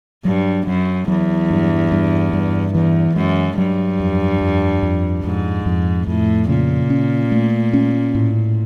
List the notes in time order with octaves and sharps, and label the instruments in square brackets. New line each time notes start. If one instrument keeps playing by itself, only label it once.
[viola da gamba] G2 [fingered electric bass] F#3
[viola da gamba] F#2 [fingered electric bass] F#3
[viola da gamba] E2 [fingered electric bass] F#3
[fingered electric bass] G2
G2
G2
[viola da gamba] E2 [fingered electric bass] E3
[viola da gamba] F#2 [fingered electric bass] G#3
[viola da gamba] G2 [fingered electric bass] F#3
[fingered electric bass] F2
F2
F2
[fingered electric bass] F2 [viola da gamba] G#2
[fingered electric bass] F2
[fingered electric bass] F2 [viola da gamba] A2
[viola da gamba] A#2 [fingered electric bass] C#3
[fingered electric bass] C#4
A3
C#4
A2